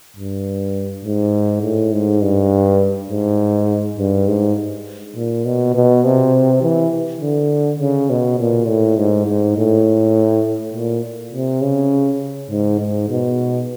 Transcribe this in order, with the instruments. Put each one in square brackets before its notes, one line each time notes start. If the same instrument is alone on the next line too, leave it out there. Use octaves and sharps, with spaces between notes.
[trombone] G2
G#2
A2
G#2
G2
G#2
G2
G#2
A#2
B2
B2
C3
E3
D3
C#3
B2
A#2
A2
G#2
G#2
A2
A#2
C3
C#3
G#2
G#2
B2